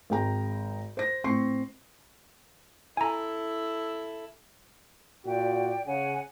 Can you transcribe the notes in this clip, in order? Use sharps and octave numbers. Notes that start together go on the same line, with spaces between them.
G#1 G#3 G5 A#5
C5 A#6
A1 C4 C6 C#6 C7
E4 A4 G#5 A#5
A#2 F#4 D5 G5
C#3 C#5 F#5 G#5